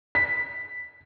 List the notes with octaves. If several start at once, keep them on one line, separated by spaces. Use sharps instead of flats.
B6